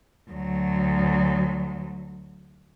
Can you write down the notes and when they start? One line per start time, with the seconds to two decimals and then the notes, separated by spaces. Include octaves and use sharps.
0.31 D2 F#3